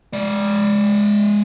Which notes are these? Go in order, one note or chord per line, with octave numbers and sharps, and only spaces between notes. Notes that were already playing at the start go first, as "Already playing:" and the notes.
G#3 D5